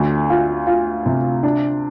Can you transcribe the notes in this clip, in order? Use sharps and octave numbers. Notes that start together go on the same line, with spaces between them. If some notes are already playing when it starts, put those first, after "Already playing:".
Already playing: D2
F4
F4
C3
D4